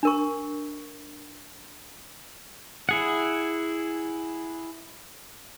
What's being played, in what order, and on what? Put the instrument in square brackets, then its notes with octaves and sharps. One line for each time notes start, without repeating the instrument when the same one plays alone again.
[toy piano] D4 A#4 C#6
[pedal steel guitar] E4 G#4 F#5